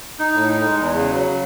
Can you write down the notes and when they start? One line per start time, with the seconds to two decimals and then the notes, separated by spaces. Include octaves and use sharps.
0.19 D#4
0.34 A2
0.49 D#4
0.65 G#3
0.80 E2
0.95 C#3
1.10 F#3
1.25 C#3